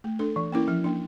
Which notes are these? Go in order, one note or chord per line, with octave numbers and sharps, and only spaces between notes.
A3
D4 A4
E3
A#3 C#4 E4 A#4
F3
A#3 D4